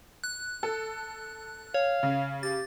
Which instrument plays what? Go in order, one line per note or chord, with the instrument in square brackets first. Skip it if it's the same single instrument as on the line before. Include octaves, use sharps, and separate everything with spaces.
[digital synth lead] F#6
[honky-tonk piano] A4
[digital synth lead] C#5 [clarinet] F5
[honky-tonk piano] C#3
[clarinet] G4 [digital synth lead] A6